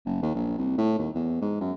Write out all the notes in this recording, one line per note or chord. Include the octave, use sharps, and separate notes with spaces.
F#1
D#2
A#1
C2
A2
D#2
E2
G#2
F#2